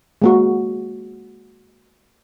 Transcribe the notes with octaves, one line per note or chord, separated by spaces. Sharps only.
G#3 A#3 F#4